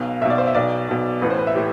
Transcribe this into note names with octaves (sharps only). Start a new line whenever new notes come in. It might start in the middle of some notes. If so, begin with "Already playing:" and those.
Already playing: B1 B2 F5
B1 B2 D5 E5
C5
E5
B1 B2 D5
B1 B2
A1 A2 E3 B4
C5
B4
E5
A2 E3 G4